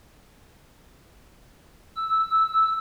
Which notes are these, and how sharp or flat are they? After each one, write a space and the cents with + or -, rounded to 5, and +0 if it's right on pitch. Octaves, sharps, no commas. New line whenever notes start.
E6 -5